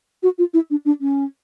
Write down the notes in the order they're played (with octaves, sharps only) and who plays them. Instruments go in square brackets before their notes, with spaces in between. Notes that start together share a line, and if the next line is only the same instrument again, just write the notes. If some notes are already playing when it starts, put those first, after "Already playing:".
[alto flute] F#4
F4
E4
D4
D4
C#4